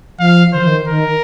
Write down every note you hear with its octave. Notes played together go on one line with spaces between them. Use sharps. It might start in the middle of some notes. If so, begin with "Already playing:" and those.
F3 F5
D#3 C5
F3
D#3
D#3 A#4